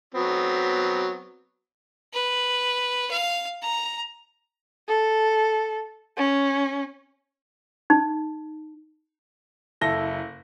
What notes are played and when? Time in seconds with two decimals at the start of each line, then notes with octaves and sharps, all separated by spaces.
0.14 F#3 B3 C4
2.13 B4
3.11 F5
3.62 A#5
4.88 A4
6.17 C#4
7.90 D#4
9.81 F#1 E4 A4 A#6 G7